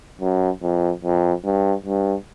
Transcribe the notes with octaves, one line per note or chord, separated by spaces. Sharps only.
F#2
F2
F2
G2
G2